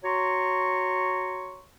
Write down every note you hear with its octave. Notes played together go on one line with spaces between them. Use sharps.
F#4 C#5 A#5 C6 C#6